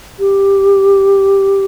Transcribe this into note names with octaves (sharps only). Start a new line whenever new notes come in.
G4